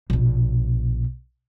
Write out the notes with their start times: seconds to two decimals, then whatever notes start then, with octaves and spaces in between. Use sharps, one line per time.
0.10 A#1 B2